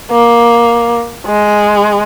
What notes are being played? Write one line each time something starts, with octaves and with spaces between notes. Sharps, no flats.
A#3
G#3